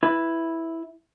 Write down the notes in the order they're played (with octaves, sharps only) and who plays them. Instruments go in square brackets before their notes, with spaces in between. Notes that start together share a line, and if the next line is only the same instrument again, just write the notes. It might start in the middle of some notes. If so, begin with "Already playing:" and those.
[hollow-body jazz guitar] E4 B4